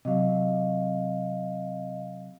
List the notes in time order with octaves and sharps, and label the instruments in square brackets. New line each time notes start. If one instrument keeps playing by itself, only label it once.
[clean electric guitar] C3 F#3 [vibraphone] D#5 F5